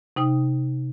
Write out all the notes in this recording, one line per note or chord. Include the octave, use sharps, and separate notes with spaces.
C3 D#4 G5 D#6